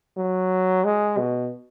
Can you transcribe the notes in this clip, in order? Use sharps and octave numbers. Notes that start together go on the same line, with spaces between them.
F#3
G#3
B2